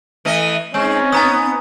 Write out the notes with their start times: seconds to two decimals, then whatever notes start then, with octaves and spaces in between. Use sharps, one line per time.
0.25 E3 A3 D#5
0.74 G#3 C4 C#4 D#4
1.12 B3 G#5 A#5 D#6